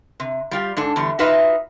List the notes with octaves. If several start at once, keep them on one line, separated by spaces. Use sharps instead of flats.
C3
G3 F4 G4
G#2 D4 A4
E2 D3 G3
D#4 F4 F#4 B4 D#5 E5